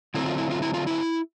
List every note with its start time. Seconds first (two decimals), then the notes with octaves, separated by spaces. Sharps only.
0.14 D3 F#3 A3 C4 E4
0.26 F4
0.38 E4
0.51 F4
0.62 E4
0.74 F4
0.87 E4